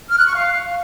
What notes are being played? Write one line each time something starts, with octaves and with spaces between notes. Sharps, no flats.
F6
F#6
C#6
F5